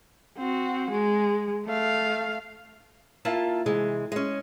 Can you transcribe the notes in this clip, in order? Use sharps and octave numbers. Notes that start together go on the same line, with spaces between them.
C4 F#4
G#3
A3 F5
A#3 E4 F4 A5
C3 E3 G#3
G#3 C#4